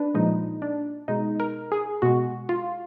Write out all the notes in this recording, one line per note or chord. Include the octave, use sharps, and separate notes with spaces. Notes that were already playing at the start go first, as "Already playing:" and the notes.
Already playing: D4 B4
A#2 F3 G#3 D#4
D4
B2 G#3 D#4
A#4
G#4
B2 G#3 F#4
F4